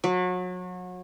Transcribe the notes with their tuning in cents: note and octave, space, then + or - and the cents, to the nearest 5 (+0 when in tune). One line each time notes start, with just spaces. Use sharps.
F#3 -30